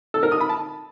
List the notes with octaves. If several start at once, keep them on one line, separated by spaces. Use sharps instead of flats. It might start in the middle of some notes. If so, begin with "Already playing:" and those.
A4
A#4
D#6
B5
A5